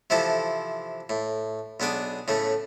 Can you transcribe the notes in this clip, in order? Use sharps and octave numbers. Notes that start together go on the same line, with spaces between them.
C3 E3 F3 E4 A4
A2
B1 B3 D4 G#4 D6
A2 C#3 A3